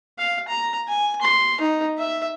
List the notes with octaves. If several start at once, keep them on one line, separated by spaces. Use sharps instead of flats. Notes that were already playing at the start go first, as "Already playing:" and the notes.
F5
A#5
G#5
C6
D#4
E5